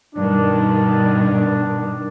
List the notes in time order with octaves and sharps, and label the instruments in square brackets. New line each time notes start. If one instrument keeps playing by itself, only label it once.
[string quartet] G2 B2 D#3 [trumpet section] D4